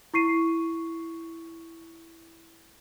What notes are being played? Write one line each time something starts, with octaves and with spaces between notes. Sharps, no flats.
E4 C#6 C7 D#7